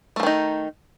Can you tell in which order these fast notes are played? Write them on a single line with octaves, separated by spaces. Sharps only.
A3 F3 D#3 D#4